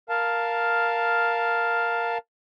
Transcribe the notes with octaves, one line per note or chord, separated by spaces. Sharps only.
A#4 F5 A5